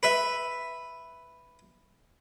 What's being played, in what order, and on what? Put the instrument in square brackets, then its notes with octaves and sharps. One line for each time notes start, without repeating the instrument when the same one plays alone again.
[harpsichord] B4 E5